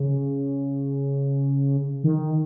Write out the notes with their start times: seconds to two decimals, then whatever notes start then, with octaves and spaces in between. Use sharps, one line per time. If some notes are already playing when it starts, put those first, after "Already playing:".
Already playing: C#3
2.04 D#3